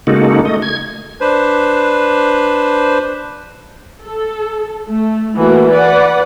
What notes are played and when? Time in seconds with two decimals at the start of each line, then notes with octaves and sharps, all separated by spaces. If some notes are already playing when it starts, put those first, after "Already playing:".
0.07 C#3 G#3 A#3 D#4 F#4 A4
0.45 A3 D#5
0.62 G#6
1.21 D4 B4 C5
4.03 A4
4.88 A3
5.35 E3 A3 A#3 F#4
5.71 B4 D5 F#5